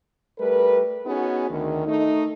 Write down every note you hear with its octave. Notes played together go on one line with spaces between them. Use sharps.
G3 A3 A#4 B4
B3 C#4 D#4 F#4 G#4
D2 D#3
A3 D#4